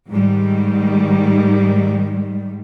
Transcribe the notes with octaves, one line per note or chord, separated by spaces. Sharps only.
G#2 D#3 G3